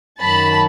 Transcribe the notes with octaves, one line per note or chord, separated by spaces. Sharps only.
F#2 D#3 F#3 A5 B5